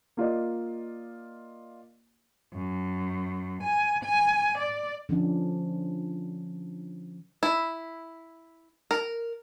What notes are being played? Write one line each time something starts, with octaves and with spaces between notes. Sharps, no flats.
A#3 F4 D5 D#5
F#2
G#5
G#5
D5
D3 F3 C#4 D4
E4
A#4